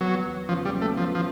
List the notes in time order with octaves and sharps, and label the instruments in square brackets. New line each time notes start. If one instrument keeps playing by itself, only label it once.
[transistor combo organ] F#3 [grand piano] B3
[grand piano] E2
[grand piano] C#3 [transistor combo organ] F3
[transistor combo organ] G3
[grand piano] F#3
[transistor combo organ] A3
[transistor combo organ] F3 [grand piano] B3
[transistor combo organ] F3